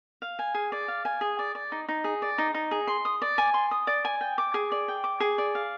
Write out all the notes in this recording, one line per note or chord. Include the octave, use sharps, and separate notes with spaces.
F5
G#5
G#4
D5
F5
G#5
G#4
D5
D5
D#4
D#4
G#4
D5
D#4
D#4
G#4
C6
D#6
D5
G#5
C6
D#6
D5
G#5
G5
D6
G#4
D5
G5
D6
G#4
D5
F5